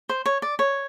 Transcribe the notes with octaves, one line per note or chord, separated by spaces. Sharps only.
C5
C#5
D5
C#5